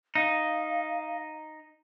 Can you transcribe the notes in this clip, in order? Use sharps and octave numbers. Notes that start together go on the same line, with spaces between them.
D#4 F5